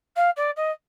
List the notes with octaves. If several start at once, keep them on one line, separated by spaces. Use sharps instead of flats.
F5
D5
D#5